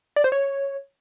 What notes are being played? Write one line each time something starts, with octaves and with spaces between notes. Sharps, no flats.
D5
C5
C#5